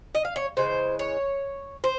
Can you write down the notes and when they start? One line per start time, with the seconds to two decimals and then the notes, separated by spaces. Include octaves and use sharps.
0.15 D#5
0.25 F5
0.36 C#5
0.57 C#3 E3 G#3 C5
0.99 C#5
1.84 C5